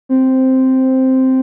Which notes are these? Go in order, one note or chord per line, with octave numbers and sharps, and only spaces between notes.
C4